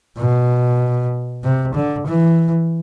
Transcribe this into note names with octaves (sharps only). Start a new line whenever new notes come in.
B2
C3
D3
E3